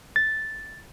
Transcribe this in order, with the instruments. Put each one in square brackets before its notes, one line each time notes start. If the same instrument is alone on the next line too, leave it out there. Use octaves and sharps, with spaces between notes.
[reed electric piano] A6